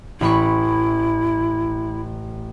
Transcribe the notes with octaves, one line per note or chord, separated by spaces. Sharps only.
A1 E4 B5 C#6